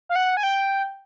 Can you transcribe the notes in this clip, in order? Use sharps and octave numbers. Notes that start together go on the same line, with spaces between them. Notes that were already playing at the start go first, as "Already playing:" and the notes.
F5
F#5
G#5
G5